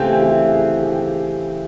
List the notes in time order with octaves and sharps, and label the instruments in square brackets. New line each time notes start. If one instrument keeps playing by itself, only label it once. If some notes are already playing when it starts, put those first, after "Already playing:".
Already playing: [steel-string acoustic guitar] C#3 E3 A3 C4 [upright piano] G4
[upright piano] G4
G#4
G4